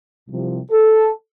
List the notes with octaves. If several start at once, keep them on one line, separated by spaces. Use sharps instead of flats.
C2 C3 F3
A4